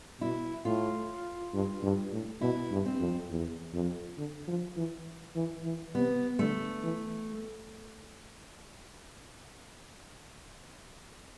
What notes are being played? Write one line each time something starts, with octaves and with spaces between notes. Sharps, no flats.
B2 E4
A2 F4
G2
G2
A2
B2 E4
G2
C4
F2
E2
F2
D3
F3
E3
E3
E3
C3 B3
D3 A3
E3